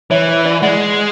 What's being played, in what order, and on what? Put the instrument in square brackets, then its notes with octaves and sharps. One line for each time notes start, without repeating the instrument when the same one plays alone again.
[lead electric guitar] E3 [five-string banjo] C#5 E5
[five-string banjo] C#5 E5
D5 F#5
[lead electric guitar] G#3 [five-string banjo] D5 F#5